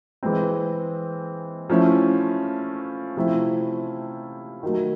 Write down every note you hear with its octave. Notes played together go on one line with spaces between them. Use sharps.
E3 G#3 C4
F3 A3 C#4 E4
C3 F3 A3 C4 E4
D#3 F#3 A3